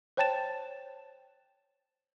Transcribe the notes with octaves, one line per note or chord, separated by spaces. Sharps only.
C5 C#5 G5 A5 A6 E7